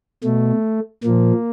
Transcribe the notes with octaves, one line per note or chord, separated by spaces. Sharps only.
B2 A3
A#2 F3 A#3